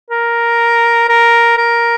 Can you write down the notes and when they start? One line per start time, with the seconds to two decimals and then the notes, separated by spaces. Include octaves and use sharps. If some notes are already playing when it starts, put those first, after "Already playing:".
0.11 A#4
1.09 A#4
1.57 A#4